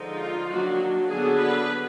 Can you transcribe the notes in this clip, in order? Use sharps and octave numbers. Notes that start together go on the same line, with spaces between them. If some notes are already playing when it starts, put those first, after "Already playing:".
Already playing: D3 F3 G#3 D#4
F4
D#3 F#3 A#3 D4 F#4
D3 F#3 B3 D4 G#4
B4